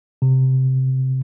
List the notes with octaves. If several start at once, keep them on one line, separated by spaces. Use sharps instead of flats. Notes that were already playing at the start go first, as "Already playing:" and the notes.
C3